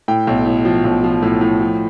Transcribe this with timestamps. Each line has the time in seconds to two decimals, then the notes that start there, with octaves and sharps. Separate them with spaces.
0.08 A2 G5
0.27 B1
0.46 A2
0.65 F3
0.84 B1
1.04 F3
1.23 A2
1.41 A2
1.61 F3